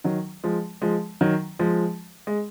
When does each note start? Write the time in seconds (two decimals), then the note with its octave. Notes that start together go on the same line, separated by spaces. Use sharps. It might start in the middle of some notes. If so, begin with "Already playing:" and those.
0.04 D#3 F#3
0.44 F3 G#3
0.82 F3 G#3
1.21 D#3 F#3
1.59 F3 G#3
2.27 G#3